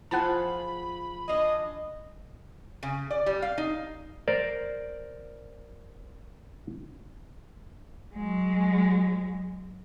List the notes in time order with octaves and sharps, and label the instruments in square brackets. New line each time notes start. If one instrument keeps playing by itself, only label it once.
[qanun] F3 F4 G#4 [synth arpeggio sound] F#5 A5 [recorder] B5
[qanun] D4 F5 G#5 [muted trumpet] D#5
[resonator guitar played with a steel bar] C#3
D5
G3
F5
D#4
[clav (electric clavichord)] A#4 C5 D5
[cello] F#3 G#3